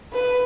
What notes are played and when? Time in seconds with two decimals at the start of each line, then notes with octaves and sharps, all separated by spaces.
0.13 B4